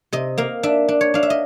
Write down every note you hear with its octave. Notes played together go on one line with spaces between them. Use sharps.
C3 D#5
A#3 F5
D4 E5
D4
C#5
D4 F5
E5
D#5